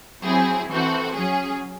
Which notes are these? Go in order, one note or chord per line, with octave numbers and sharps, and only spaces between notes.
F#3 C4 E4 G#4
E3 C4 F#4 A4
F#3 C#4 G#4